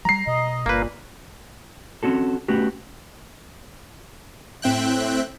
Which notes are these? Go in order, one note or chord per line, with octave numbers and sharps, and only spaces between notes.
F#3 G3 A#5 C7
B2 D#5
G1 A#2 A#3 B4
C4 C#4 F#4 A4
A3 B3 C#4 F#4 G4
A2 C4 E5 G5 F#6